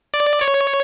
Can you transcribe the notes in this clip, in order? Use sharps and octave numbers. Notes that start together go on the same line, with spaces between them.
D5
C#5